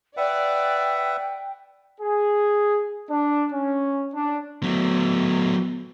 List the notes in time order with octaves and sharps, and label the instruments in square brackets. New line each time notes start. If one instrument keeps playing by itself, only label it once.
[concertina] B4 E5 F#5 [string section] D5 [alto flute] G5
[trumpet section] G#4
D4
C#4
D4
[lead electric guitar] F#3 A3 [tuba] B3